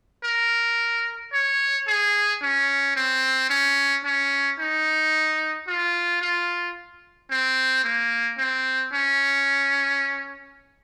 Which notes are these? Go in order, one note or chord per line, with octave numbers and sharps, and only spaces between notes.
A#4
C#5
G#4
C#4
C4
C#4
C#4
D#4
F4
F4
C4
A#3
C4
C#4